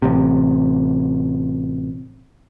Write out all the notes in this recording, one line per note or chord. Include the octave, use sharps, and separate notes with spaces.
A1 C3